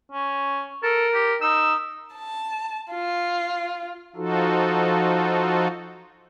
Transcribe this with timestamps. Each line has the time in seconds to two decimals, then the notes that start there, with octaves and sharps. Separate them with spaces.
0.12 C#4
0.83 A4 A#4
1.14 G4
1.41 D#4 E6
2.14 A5
2.91 F4
4.16 F3 D#4 F4 F#4 A4